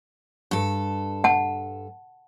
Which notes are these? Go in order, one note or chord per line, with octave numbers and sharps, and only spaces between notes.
G2 A4
F#5 A5